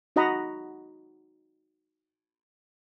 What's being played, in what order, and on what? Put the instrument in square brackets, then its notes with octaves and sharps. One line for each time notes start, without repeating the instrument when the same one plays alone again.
[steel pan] D#4 F#4 D#5 F#5 A#5 B5